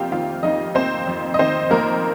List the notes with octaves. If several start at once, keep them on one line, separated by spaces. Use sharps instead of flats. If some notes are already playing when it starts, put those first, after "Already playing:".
Already playing: F2 A#3 C4 F4 G4 C5 F5 G5
D#3 F4 F5
F2 D#4 D#5
A#3 C4 C5
F2
D#5
D#3 C4 C5
F2 A#3 A#4